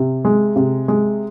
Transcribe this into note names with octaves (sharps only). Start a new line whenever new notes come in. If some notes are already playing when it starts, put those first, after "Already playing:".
Already playing: C3
G#3
C3
G#3